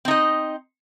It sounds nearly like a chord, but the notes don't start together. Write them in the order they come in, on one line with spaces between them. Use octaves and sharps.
C4 D#4 D#5